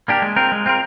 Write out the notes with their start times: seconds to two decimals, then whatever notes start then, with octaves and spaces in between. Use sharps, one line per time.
0.08 A#3 D4 G4 A#4
0.22 G#3
0.36 C4 F4 A#4
0.52 G#3
0.66 C4 F4 A#4